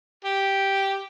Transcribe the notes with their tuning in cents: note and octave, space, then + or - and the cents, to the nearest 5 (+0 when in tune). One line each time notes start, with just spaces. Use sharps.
G4 -5